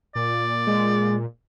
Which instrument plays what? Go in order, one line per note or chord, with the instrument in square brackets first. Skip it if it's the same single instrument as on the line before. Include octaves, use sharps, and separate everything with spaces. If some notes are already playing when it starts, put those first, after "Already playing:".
[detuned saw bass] A#2 [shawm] D5
[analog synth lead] G#3